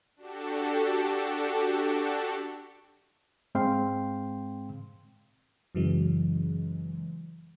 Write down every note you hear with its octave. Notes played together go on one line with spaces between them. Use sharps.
D4 F#4 G4 A4
G#2 G#3 C4 F5 G5 C6
F#2 C#3 E3 F#3 G#3